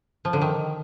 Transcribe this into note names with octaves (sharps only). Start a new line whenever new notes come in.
F3
D3
D#3